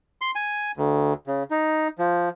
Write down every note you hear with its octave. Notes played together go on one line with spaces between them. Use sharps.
C6
G#5
D2
C#3
D#4
F3